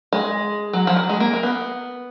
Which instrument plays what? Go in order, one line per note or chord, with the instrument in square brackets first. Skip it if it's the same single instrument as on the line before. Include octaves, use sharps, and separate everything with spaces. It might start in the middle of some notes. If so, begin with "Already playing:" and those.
[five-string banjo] G#3
F#3
F3
F#3
G#3
A#3
A#3
B3